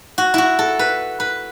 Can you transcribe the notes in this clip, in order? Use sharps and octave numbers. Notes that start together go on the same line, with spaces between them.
F#4
E4 F#4
A4
B4
B4